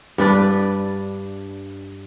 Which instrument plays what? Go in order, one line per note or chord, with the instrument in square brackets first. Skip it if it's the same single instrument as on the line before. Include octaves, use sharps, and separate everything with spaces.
[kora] G2 D4 B4 D5